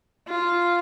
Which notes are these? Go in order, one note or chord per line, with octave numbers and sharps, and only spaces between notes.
F4